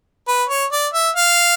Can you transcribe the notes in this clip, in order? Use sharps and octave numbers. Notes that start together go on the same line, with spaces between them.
B4
C#5
D5
E5
F5